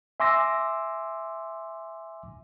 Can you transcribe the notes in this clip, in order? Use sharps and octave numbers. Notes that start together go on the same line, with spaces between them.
E5 G#5 C6 D6 E6 A#6